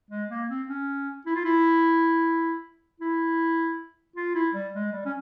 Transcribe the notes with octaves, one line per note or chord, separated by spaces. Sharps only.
G#3
A#3
C4
C#4
E4
F4
E4
E4
F4
E4
G3
G#3
G3
C#4